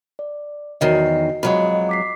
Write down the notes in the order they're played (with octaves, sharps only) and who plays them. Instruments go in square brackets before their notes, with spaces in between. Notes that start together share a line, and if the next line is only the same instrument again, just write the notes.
[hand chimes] D5
[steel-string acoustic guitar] E2 D#3 F#3 [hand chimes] D#5 C7
[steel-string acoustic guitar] F2 F#3 G#3 [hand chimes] D#5 B5
[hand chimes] D6 B6 C7